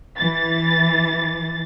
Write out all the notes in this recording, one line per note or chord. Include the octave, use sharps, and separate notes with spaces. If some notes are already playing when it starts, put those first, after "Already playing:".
E3 A6